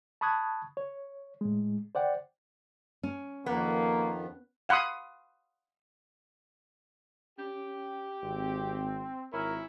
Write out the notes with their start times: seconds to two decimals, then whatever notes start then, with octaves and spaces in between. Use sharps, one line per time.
0.21 A5 B5 C#6 D#6 F#6 G#6
0.77 C#5
1.41 A2 G#3
1.95 C5 D5 F#5 G5
3.03 C#4
3.46 F2 D#3 F3 A#3 B3
4.69 F5 F#5 B5 C6 D#6
7.39 C#4 G4
8.22 G#1 C4
9.33 G#1 C#4 E4 A#4